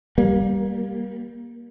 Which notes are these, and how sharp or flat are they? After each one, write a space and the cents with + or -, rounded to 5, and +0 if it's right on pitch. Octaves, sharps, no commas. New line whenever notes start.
G3 +0 A#3 +20